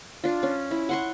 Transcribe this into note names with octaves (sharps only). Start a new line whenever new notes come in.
D4 F4
C#4
E4
F#5 C6 C#6